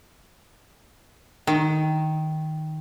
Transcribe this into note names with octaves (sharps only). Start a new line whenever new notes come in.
D#3